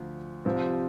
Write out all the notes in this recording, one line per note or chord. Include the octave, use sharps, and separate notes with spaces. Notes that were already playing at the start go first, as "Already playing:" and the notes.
Already playing: D2 D3 F3
C2 C3 F3 C4